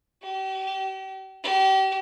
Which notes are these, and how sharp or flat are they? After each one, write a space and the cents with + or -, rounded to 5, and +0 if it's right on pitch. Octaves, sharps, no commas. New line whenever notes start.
G4 -40
G4 -35